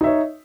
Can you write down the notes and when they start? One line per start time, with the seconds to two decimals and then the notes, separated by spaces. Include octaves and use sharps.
0.01 D#4
0.04 E5
0.07 C#5